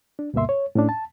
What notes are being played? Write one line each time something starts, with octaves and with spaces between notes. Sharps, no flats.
D4
D2 G2 B2 A#3 E5 C6
C#5
A2 C#4 D4
A5